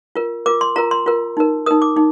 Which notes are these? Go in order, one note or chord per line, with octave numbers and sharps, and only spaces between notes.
F4 A#4
F4 A#4 D6
C6
F4 A#4 A#5
C6
F4 A#4
D#4 A#4
D#4 A#4 D#6
D6
D#4